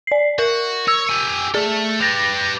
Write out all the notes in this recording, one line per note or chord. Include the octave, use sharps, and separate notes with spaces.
D5 C7
F#4 A#4
C#5 E6
G4 G#5
A3 G#4 A4
G4 B4 A6 A#6 F7